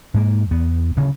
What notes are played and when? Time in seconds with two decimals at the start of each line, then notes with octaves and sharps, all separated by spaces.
0.14 G#2 G#3 A#3
0.51 E2 B3
0.96 D1 C#3 C#4